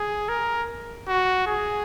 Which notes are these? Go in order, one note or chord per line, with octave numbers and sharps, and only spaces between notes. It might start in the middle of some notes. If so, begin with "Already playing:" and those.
Already playing: G#4
A#4
F#4
G#4